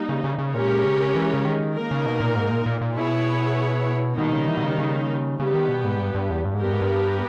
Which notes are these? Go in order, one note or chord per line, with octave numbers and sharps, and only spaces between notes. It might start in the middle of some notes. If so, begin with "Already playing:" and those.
Already playing: G3 A#3 D#4
C#3
C#3
C#3
A#2 G#3 C#4 G4 A#4 C#5
C#3
E3
C#3
D#3
A#3 D#4 A#4
C#3
B2
A#2
G#2
A#2
A#2
A#2
B2 B3 E4 G#4 C#5
B2 D#3 G3 A#3 D#4
C#3
E3
B2
C#3
C#3
C#3 G3 B3 G4
D#3
B2
G#2
G2
G2
E2
G2
G#2
G2 B3 G4 A#4
G#2
G2